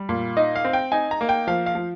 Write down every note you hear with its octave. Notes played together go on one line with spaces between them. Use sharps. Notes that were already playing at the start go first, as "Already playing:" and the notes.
Already playing: G3
A#2
D#4 D#5
F5
C4
G5
D#4 G#5
A#5
A#3
G5
F3 F5
F5
F3